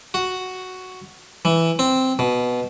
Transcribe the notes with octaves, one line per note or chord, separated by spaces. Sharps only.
F#4
E3
C4
B2